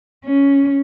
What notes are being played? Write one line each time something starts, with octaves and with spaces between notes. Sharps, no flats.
C#4